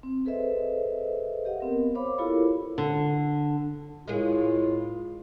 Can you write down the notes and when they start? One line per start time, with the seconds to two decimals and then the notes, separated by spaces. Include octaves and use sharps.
0.03 C4
0.25 G#4 A4 B4 C5 D#5 E5
1.45 G4 D#5 F5 F#5
1.60 B3 C4 A#4
1.95 C5 C#5 F5 B5 D6
2.18 E4 F4 G4 A4 A#4 C#5
2.78 D3
4.07 A2 G#3 A#3 F4 G#4